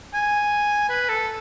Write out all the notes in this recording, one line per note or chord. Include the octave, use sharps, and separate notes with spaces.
G#5
B4
A4